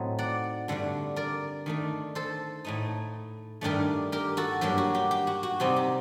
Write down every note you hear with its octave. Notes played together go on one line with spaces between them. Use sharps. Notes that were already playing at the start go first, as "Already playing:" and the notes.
Already playing: A2 F#3 A3 C4 D#4
D5 F#5
G2 D3 A3 D4
A#4 D5
D#3 A3 D4
A4 C5
A2 A3 D#4
G2 D#3 A3 D4 G4 A#4
G4 A#4
F#4 A4
G2 F#3 A#3 G4
F#4
G4
G4
F#4
F#4
C3 G3 C4 D#4 G4
G4